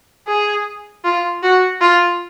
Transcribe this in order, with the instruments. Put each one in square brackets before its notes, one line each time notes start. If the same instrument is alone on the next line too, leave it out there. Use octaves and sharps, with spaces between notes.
[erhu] G#4
F4
F#4
F4